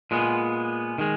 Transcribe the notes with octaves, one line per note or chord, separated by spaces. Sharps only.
A#2 G#3 B3
D#3 G#3